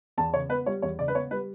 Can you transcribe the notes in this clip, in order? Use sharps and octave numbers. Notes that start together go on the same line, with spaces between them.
E2 A5
C#3 C#5
B3 B4
G3 C#5
E2 C#5
C#3 D5
B4
B3 C#5
G3 B4